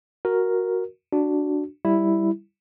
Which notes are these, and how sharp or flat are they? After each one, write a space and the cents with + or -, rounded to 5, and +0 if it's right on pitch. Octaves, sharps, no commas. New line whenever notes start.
F#4 -5 A#4 +0
D4 +0 F#4 +0
G3 +0 E4 +0